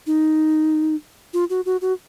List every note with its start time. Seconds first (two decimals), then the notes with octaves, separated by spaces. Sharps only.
0.07 D#4
1.33 F4
1.50 F#4
1.66 F#4
1.81 F#4